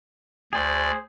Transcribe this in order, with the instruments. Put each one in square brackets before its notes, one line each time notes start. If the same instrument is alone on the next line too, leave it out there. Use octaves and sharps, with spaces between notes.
[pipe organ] D2 D5 [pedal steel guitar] G#4 C5